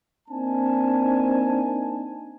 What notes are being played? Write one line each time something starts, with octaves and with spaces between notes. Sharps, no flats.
A#3 C4 D4 D#4 G#5 A5